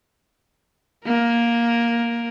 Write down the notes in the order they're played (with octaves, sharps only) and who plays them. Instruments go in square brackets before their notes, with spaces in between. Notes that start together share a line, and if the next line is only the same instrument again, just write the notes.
[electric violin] A#3 A#4